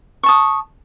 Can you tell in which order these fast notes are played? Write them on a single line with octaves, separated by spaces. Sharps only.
C#6 A5 D#6